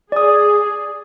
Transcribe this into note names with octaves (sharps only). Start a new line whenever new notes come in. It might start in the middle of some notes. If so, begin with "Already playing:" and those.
G#4 D5 D#6